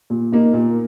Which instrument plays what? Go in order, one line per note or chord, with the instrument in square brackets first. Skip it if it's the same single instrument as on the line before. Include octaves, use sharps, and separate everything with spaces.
[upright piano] A#2
A#3 D#4
A#2